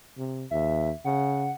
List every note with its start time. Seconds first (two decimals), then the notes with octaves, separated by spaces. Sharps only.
0.18 C3
0.51 D#2 E5
1.05 C#3 F#5